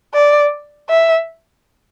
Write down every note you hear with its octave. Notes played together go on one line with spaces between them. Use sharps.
D5
E5